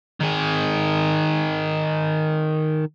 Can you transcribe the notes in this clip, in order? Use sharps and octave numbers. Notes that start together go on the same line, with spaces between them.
D#3 G#4